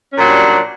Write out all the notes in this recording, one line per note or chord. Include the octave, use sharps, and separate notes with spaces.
A#2 F#3 G3 C#4 D4